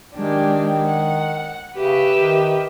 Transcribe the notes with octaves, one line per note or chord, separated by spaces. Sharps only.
D#3 G#3 D4 G4
F#5
C#3 G4 B4 E5
D#3